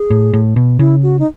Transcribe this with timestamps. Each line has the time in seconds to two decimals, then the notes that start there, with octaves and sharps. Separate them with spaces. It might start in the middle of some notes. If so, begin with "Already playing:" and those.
Already playing: G#4
0.10 A2
0.33 A2
0.56 B2
0.79 C#3 E4
1.03 F#4
1.19 D#4